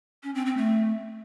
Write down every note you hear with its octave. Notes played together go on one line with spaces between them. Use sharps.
C#4
C4
C4
A3